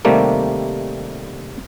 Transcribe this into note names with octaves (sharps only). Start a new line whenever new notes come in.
C3 D#3 G3 A3 A#3